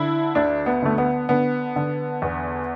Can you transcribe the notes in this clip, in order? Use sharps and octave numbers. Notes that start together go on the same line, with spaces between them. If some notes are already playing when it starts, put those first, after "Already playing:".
Already playing: D3 E4
D2 D4
B3
D3 A3
B3
D3 B3
D3
E2